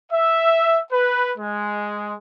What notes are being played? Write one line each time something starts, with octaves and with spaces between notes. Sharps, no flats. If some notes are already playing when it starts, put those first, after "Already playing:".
E5
B4
G#3